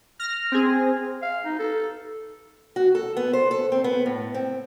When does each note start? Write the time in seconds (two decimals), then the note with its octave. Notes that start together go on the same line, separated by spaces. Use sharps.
0.19 F6 A#6
0.52 C4 G#4
1.22 F5
1.45 D#4
1.59 A4
2.76 F#4
2.95 A4
3.17 B3
3.33 C5
3.51 A4
3.72 C4
3.84 B3
4.06 A2
4.35 C4